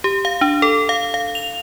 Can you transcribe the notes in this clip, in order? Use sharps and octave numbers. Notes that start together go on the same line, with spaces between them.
G4
F5
D4
A4
F5
F5
F7